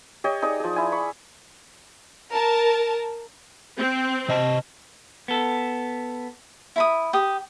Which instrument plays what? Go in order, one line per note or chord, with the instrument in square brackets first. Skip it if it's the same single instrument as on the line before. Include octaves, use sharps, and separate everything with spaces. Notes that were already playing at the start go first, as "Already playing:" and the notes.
[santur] G4 C#5 D#5
D#4 G#4 D5 D#6
F3 G#4
E4 G#5
B5 C#6
[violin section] A#4 A5
[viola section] C4
[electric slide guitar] C3 D#5 A5
[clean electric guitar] B3 A4
[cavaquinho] E4 B5 D#6
G4 D#6